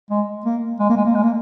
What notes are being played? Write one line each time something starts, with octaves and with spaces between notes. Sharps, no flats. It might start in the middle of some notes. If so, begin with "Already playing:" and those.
G#3
A#3
G#3
A#3
G#3
A#3
G#3
A#3